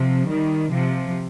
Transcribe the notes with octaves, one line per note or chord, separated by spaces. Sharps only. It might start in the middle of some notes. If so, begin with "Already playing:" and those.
Already playing: C3 F3
D#3 G3
C3 F3